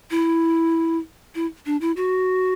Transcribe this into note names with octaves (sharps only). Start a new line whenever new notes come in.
E4
E4
D4
E4
F#4